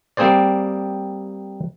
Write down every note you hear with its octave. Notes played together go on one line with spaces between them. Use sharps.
G3 A#3 C4 G#4 C5 D5